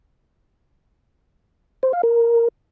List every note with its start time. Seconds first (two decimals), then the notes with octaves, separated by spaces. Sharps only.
1.83 C5
1.93 F5
2.03 A#4